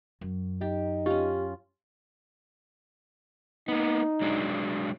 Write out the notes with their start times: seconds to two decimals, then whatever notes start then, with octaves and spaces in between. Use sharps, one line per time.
0.21 F#2
0.61 D#4 G4
1.06 C#4 F4 G4
3.68 A#3 B3 D#4
4.22 F#3 G#3 D4